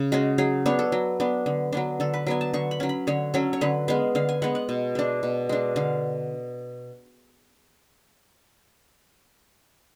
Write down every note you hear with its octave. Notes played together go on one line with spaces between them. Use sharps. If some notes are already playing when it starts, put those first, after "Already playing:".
Already playing: C#3
G#3 C#4 F#4
F#3 G#4
B3 D4 C#5
A4
F#3
B3 D4
D3
F#3 B3 D4
D3 A4
B4
F#3 B3 D4 G#5
A5
D3 C#6
B5
F#3 C#4
B5
D3 C#5
F#3 C#4 A4
C#5
D3 B4
G#3 B3 F5
D3 F5
G#5
G#3 B3 F#5
F#5
B2
G#3 D4
B2
G#3 D4
D3 F5